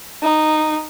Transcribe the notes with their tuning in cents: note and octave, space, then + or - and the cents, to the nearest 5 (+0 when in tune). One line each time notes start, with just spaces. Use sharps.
D#4 -10